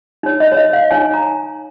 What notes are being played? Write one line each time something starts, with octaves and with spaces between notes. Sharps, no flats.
D#4 C#5
D#5
C#5
D#5
F5
D#4 C#5 G#5
A#5